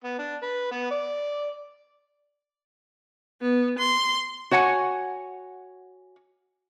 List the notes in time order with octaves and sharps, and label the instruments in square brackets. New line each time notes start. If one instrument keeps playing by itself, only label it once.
[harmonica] B3
D4
B4
B3
D5
[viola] B3
C6
[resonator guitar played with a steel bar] F#4 C#5 F#5 G#5